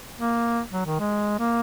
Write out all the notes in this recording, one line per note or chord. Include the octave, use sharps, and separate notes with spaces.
A#3
F#3
D#3
G#3
A#3